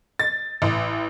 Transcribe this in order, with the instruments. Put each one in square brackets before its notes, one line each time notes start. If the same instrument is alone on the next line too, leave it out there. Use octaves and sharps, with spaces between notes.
[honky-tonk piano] A6
A1